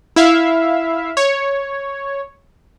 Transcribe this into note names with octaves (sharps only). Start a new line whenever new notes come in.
E4 E5 F5
C#5